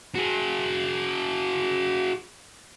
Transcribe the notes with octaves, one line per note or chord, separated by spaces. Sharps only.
F#4 G#4